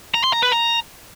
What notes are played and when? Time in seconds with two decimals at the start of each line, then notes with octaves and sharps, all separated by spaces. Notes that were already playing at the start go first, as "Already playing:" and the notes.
0.14 A#5
0.24 C6
0.33 A#5
0.42 B4
0.52 A#5